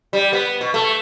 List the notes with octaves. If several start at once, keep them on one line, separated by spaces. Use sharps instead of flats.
G3
B3
B2
A3